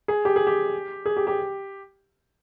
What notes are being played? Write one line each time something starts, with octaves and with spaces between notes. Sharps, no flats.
G#4
G4
G#4
G4
G#4
G4
G4